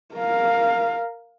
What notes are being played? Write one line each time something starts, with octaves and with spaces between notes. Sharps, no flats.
A#4 F5